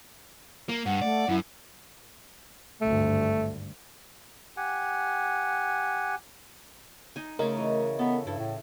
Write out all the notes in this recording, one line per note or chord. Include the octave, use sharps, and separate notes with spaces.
A#3
G2 F#5
A3 D5
F#2 E4
G#1 D2 G2 A3
G4 F#5 G#5
D#4 G#5
C#3 A3 A#4 C#5 D#5 C6
E3
B3 A4
G2 E4 A4
A2